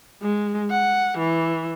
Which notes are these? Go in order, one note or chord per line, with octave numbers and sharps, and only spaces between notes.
G#3
F#5
E3